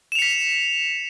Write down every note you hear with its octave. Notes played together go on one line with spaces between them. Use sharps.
B6 C#7 E7 F7